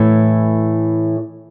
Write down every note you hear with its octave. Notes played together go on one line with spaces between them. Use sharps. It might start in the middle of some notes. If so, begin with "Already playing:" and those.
Already playing: A2 E3 A3